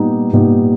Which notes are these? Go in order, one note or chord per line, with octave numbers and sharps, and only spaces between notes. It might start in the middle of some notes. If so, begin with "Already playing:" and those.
Already playing: A#2 G3 B3 D#4 G4
A#2 G3 B3 D#4 G4